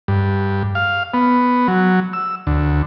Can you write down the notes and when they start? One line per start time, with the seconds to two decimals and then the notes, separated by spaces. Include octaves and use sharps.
0.08 G2
0.75 F5
1.14 B3
1.68 F#3
2.13 E6
2.47 D2